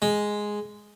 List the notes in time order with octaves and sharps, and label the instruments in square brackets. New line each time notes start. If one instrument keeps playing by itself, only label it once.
[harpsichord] G#3